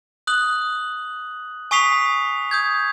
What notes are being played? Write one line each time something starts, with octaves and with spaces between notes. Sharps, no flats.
D#6 F#6 F#7
G#5 C#6 D#6 B6 C7 F7
D#6 G6 G#6